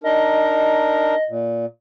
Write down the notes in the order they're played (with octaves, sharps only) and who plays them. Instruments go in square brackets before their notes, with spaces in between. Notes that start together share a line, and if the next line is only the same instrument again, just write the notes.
[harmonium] D4 D#4 A#4 [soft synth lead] D#5
[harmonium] A#2